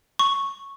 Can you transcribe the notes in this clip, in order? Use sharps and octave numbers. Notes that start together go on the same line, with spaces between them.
C#6